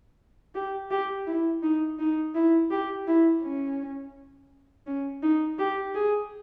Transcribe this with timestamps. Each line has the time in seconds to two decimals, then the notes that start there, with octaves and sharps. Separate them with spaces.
0.55 G4
0.91 G4
1.27 E4
1.63 D#4
1.99 D#4
2.35 E4
2.71 G4
3.07 E4
3.43 C#4
4.87 C#4
5.23 D#4
5.59 G4
5.95 G#4